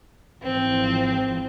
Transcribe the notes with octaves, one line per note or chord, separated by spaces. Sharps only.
G#1 E3 F3 C4